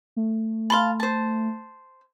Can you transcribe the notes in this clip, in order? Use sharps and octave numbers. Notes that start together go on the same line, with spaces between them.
A3
F5 A5 B5 C6
C5 A5